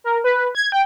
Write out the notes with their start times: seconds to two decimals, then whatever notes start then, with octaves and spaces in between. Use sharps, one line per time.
0.04 A#4
0.24 B4
0.55 G#6
0.72 G5